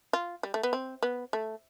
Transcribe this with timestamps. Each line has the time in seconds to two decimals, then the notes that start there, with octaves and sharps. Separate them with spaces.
0.13 F4
0.43 G3
0.54 A3
0.63 B3
0.73 C4
1.03 B3
1.33 A3